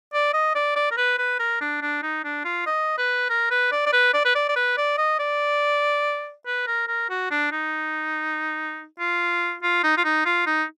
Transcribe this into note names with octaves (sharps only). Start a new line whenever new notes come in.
D5
D#5
D5
D5
A#4
B4
B4
A#4
D4
D4
D#4
D4
F4
D#5
B4
A#4
B4
D5
D5
B4
D5
B4
D5
D5
B4
D5
D#5
D5
B4
A#4
A#4
F#4
D4
D#4
F4
F4
D#4
F4
D#4
F4
D#4